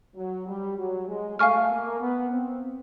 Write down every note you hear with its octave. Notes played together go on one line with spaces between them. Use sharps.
F#3
G3
F#3
G#3
A3 F5 G#5 C#6 F6
A#3
B3
C4